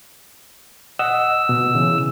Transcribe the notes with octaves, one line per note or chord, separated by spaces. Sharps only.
D#5 F#5 D#6 E6
B2
C#3 E3